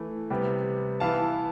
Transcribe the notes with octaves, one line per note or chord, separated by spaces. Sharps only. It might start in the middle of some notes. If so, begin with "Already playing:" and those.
Already playing: E3 A3 E4
C3 G3 B3
E3 B3 E4 F5 A5